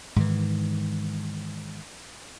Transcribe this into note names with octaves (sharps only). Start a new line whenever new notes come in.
G#2 D#3 E3